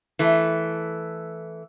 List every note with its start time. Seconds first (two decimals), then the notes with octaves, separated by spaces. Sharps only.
0.19 E3 A3